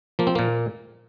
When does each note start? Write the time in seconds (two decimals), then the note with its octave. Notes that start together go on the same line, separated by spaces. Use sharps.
0.19 F3 A#3
0.27 C4
0.35 A#2 A#3